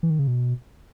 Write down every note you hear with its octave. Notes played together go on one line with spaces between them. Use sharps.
E3
D#3
C#3
B2